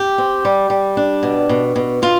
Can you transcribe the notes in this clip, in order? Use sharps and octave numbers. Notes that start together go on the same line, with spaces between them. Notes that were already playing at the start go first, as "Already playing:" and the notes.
Already playing: G4
C4
G3
G3
D4
B2
B2
B2
B2 F4